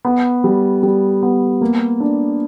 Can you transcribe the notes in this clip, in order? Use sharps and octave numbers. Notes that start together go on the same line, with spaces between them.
B3
G3
G3
B3
A#3
D4